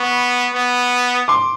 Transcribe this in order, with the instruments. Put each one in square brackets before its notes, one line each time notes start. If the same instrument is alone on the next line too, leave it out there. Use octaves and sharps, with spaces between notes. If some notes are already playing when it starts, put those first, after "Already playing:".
Already playing: [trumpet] B3 [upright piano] B5 C#6
[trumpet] B3
[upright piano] C6 D6